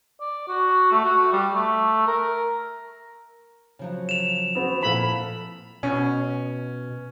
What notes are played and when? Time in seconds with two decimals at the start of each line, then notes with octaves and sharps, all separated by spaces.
0.21 D5
0.48 F#4
0.91 A3
1.05 F#4
1.32 G3
1.53 A3
2.07 A#4
3.79 C#3 F3 F#3
4.09 E7 F7
4.55 B3 C4 F#4
4.83 F2 A#2 F3 E4 A4 F5 B5
5.83 B2 C#4